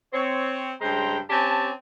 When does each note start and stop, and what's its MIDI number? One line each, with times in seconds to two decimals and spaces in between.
0.13 0.71 60
0.13 0.71 73
0.81 1.17 43
0.81 1.17 49
0.81 1.17 56
0.81 1.17 72
0.81 1.17 79
0.81 1.17 82
1.30 1.70 60
1.30 1.70 61
1.30 1.70 67
1.30 1.70 80
1.30 1.70 81